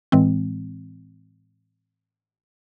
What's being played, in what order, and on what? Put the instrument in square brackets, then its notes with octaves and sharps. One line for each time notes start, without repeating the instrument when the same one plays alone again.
[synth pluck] A2 E3 G#3 C4